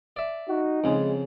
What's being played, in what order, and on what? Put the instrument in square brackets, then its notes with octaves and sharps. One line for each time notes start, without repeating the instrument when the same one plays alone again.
[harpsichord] D5 E5
[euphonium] D#4 [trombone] F#4
[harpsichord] F2 C#3 [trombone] G#3